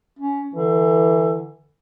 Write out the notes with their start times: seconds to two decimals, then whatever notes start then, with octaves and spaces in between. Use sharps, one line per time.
0.19 C#4
0.54 D3 E3